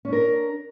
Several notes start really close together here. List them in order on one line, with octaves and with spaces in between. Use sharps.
C#4 D4 A#4